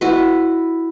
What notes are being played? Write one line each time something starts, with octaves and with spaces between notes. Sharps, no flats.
E4 F#4 B4